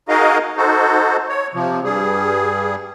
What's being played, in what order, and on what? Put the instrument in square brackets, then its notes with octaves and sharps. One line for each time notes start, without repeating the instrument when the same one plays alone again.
[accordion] D#4 F#4 G#4 A#4 D#5 F5
D#4 F#4 A4 C5
C#5
C3 F3
G2 G3 G#4